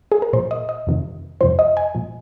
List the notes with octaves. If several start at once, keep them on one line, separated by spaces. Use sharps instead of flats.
G#4
A#4
A#2 F3 C5
D#5
D#5
F2 C3 D#3
F2 C3 F3 C5
D#5
G#5
A#2 F3